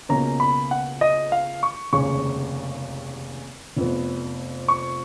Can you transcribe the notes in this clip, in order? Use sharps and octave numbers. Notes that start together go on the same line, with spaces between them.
C#2 B2 A#3 C#4 A#5
B5
F#5
D#5
F5
C#6
F1 D#2 C#3 G#3 C#4 C#6
F1 F2 F3 B3
C#6